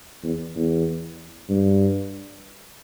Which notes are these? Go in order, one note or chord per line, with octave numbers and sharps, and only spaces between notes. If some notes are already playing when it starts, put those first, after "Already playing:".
E2
E2
G2